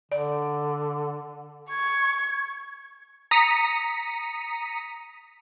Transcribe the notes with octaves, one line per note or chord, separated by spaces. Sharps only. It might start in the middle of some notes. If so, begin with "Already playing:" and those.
D3 D5
C#6 G#6
A#5 D#6 B6 C#7